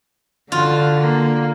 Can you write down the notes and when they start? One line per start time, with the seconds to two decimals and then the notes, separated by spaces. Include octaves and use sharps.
0.52 D3 F4 F#4
1.01 A#3